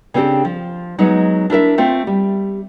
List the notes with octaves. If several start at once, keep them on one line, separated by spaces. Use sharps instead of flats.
C#3 B3 C4 D4 G4 A4
F3
F#3 G#3 B3 D#4
D4 E4 A#4 E5
A3 C4 F4
G3